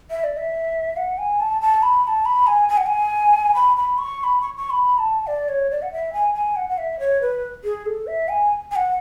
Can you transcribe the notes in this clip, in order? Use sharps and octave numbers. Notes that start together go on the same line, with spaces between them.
E5
D5
E5
F#5
G#5
A5
A5
B5
B5
A5
B5
G#5
G#5
F#5
G#5
B5
B5
C#6
C#6
B5
C#6
C#6
B5
A5
D5
C#5
D5
F#5
E5
G#5
G#5
F#5
F#5
E5
C#5
B4
G#4
A4
E5
G#5
G#5
F#5